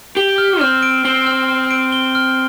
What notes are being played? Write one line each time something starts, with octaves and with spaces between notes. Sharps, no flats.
G4 G7
F6
C4 F6
D7
C4 G7
F6
F6
D7
G7
F6